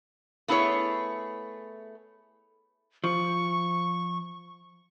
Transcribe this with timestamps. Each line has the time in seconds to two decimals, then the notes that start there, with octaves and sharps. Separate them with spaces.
0.48 A3 B3 E4 G#4 C#5
3.04 F3 C#6